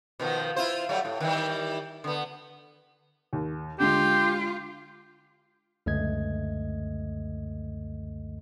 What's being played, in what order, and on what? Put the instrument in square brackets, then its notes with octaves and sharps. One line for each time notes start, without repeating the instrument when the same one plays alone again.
[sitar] B2 D#3 F3
E4 F4 C5
F#3 G3 A3
A2
D#3 E3 G3
D3 B3
[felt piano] D#2
[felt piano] D3 G#3 [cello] F4 [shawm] G4
[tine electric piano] C#2 F#2 D3 A3 D#5 G#6